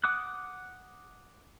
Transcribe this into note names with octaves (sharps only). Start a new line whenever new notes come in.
F#5 D6 D#6 F#6